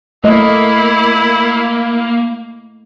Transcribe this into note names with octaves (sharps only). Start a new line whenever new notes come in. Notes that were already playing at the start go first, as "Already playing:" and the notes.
A3 A#3 E4 D#5